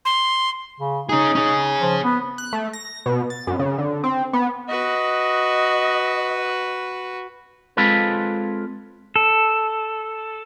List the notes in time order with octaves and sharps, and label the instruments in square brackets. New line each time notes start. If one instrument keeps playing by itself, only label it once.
[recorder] C6
[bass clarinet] C#3
[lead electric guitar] C#4 G#4 [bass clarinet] D#4
[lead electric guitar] C#4 G#4
[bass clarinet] F3
B3
[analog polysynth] F#6
A3
A#6
B2
A6
F#2
C#3
D3
C4
B3
[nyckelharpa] F#4 B4 [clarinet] D#5
[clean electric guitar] G#3 C4 F4 A4 B4
[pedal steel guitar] A4